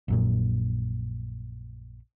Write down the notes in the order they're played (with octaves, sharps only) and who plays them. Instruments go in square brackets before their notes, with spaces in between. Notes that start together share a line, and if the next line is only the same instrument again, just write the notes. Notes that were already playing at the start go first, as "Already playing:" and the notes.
[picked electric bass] A#1 F#2 A#2